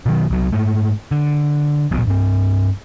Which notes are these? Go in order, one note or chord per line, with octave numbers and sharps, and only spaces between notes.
B2 D#3 F#3
C2 F#3
G#2 A3
D3
D1 A#1 B2
G2 C4